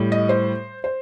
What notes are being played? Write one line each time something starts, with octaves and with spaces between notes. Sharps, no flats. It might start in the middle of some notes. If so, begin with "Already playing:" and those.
Already playing: A2 G3
D#5
C5
C5